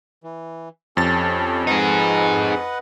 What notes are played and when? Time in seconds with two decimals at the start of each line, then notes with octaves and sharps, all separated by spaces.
0.23 E3
0.97 F2 C#4 G4 A4 A6
1.67 D#4 G#4 B4 D#5 F#5